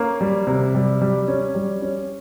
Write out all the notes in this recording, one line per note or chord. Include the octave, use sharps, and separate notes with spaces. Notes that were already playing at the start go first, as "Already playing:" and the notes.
Already playing: A#3 C#4
G3
C3
G3
G3
C#4
G3
C#4